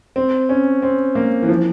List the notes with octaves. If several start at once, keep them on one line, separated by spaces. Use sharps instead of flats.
C4
C#4
C4
A#3
E3
F3